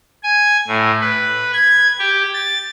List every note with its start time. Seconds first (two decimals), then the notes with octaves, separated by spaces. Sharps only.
0.23 G#5
0.67 A2
1.01 B4
1.53 G#6
1.99 G4
2.34 A6